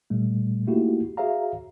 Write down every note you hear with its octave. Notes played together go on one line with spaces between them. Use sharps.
A#2 G3 A3
A3 A#3 D#4 E4 F#4 G4
F#4 G#4 C#5 E5 F5 A#5